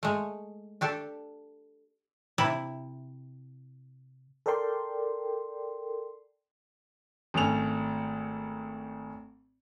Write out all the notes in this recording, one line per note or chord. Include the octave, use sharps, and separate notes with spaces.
G#3 A3
D4 G4 A4
C3 E4
A4 A#4 D5 G5 C6
G#1 A3 C#4 F7